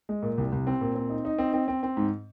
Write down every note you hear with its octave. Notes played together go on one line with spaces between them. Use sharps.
G#3
A#2
C2
C2
C4
A#2
C4
D#4
D#4
C4
C4
C4
C4
G#2